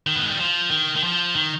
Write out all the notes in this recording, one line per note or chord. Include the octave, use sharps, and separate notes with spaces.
D#3
B3
G#3
G3
F3
D#3
D#3
F3
D#3